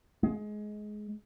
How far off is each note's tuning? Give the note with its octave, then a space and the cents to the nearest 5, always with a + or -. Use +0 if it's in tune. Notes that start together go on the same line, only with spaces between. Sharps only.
G#3 +20